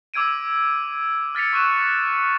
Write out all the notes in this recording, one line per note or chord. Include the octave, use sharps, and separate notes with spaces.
D6 E6 G#6 D7 D#7
F6 A6 B6 C#7 F7
C#6 F6 F#6 D#7 E7